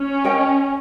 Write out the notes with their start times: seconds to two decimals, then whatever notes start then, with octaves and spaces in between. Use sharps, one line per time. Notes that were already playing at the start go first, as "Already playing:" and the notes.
Already playing: C#4
0.24 A#4 D#5 G5